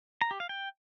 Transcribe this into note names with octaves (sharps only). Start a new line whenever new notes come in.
A#5
G4
F5
G5